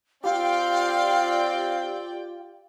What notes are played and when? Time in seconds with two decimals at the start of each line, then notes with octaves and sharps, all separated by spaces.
0.24 C4 F4 G4 D5 F5 G5